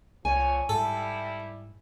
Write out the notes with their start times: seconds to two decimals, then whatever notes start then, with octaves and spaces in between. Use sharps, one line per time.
0.25 C2 A#2 F3 C#5 G#5
0.69 G#2 G3 E4 A4